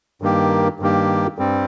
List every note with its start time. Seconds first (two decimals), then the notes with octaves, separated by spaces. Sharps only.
0.21 G2 D#3 A#3 G4
0.80 G2 D#3 A#3 G4
1.38 G2 G3 C4